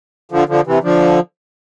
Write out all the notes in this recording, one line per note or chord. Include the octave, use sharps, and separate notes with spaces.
D3 F3
D3 F3
C3 E3
D3 F3